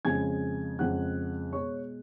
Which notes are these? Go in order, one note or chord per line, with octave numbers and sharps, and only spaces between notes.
F2 C#3 G#3 G#5 G#6
F2 C#3 G#3 F#5 F#6
B2 G#3 C#5 C#6